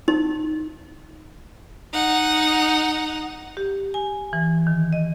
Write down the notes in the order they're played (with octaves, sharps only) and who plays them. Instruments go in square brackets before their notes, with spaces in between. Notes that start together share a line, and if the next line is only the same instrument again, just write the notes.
[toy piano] D#4
[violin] D#4 F#5
[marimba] G4
G#5
E3
D#3
D#5